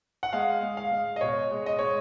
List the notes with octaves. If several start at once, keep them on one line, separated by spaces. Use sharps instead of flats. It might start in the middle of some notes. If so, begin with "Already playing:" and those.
F#5
G#3 F5
G#3
F5
G#3
D#5
B2 C#5
G#3
D#5
G#3 C#5